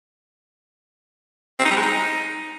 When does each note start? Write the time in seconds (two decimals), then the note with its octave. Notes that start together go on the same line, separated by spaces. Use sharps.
1.59 C4
1.65 D#4
1.71 G3
1.76 G#3
1.82 D#4